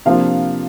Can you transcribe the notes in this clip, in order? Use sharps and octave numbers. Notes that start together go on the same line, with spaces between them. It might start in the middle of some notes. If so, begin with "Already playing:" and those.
C3 F3 A#3 D4 F4 F5